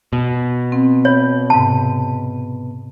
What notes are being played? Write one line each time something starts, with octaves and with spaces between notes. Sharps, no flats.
B2
C4
C#5 B5
G#2 C3 A5